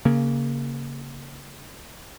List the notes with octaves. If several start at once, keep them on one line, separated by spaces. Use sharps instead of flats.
C#3 A#3